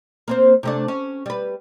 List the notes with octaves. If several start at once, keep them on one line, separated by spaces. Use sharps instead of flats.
A#3 C4 C5
C3 A3 D4
C#4
G3 B4